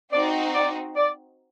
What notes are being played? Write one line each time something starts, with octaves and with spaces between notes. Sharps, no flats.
C4 D#4 F#4 D5
D5
D5